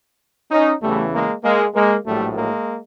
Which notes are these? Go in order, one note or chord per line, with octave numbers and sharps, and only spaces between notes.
C#4 D#4
E2 C#3 E3 G3 A3
G#3 A#3
G#3 A#3
G#3 A#3
A#1 A2 F#3 G3 A3
G#3 A#3